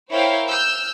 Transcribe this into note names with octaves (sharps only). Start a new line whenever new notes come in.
E4 A#4 C5 C#5 F5 G5
E6 F6 G6